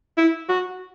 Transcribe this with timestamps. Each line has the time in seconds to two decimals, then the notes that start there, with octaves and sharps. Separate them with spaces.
0.18 E4
0.49 F#4